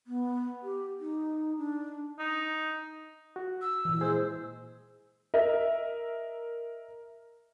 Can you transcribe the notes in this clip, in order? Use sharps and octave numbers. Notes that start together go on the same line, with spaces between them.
B3
G4
D#4
D4
D#4
F#4
E6
A#2 E3
G#3 G#4 C5
A#4 D#5 E5